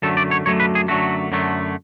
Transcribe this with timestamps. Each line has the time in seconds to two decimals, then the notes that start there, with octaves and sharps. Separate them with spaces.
0.02 F#2 D3 F#3 A3 A4
0.17 D5
0.31 C#5
0.45 F#2 D3 F#3 A3 C#5
0.60 B4
0.75 G#4
0.88 F#2 D3 F#3 A3 F#4
1.32 F#2 D3 F#3 A3